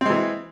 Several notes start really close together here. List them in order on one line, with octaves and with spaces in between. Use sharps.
C4 G#3 E3